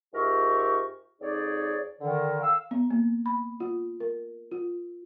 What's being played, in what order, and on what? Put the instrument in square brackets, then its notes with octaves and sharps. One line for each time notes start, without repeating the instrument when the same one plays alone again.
[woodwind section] G#2 F4 G4 A#4 E5 C#6
F2 D#4 G#4 C#5 D5
D3 D#3 A#4
F5 E6
[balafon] B3
A#3
B5
F4
A#4
F4